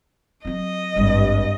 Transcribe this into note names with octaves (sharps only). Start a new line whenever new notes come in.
F#3 C4 D#5
G#1 G2 G3